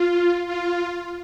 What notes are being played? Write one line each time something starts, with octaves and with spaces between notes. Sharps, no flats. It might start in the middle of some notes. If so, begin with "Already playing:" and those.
Already playing: F4
F4